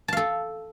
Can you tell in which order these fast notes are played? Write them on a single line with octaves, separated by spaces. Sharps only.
A5 F5 A4